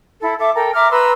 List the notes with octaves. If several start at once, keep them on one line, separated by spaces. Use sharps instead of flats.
E4 A4
A4 E5 D6
A4 A#4 G5
E5 A#5 D6 F6
B4 A#5 C6 E6